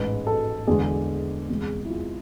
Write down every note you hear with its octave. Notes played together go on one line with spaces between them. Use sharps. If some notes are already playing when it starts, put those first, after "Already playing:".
Already playing: A1 G#2 G#3 B4
A4
E2 D3 G#3 G#4
E2 C3 G#3
E4
F4